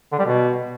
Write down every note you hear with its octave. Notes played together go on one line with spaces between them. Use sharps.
D3
G3
B2